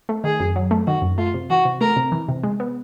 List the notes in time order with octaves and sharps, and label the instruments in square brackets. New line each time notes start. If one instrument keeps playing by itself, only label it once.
[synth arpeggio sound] A3
[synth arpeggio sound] D#3 [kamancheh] G#4
[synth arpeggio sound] F#2
F#3
A3
[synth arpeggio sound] D#3 [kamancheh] F#4
[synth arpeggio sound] F#2
[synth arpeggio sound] A3 [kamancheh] F4
[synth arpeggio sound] C3
[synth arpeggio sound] E3 [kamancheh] F#4
[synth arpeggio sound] C3
[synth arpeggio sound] A3 [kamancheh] A#4
[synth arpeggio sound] C3
E3
C3
G#3
B3